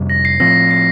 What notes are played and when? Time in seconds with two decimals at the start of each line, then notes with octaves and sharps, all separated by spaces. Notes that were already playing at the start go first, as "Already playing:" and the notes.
Already playing: F2 C3 G3
0.10 A#6
0.25 C7
0.40 A2 F3 C4 A#6
0.71 C7